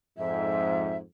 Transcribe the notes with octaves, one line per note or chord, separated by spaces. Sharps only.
F2 G#2 E5